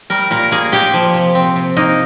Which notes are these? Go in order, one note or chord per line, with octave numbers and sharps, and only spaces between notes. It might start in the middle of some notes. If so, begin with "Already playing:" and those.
G3 A#4
A#2 A#4
A#3 G#4
A#2 G4
F3
C3
C4
C3
A#3 D#4